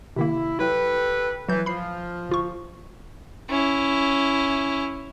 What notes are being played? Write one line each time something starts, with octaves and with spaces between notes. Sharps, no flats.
C3 D#3 A#3 E4
F#3 E4 G4 A4 B4
E3 F#3 G6
F3 B5 C7
G1 F4 C#6
C#4 E4